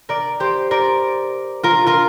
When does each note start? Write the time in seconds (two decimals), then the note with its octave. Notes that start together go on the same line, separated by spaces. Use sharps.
0.09 A#4 D5
0.40 G4 C5
0.71 A#4 D5
1.63 F4 A#4
1.87 F4 A#4